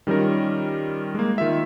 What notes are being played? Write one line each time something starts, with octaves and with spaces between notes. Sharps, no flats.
D#3 G3 C#4 F4 A#4
G#3 A#3
D#3 F4 E5